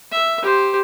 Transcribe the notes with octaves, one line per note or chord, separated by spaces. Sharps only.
E5
G4 C5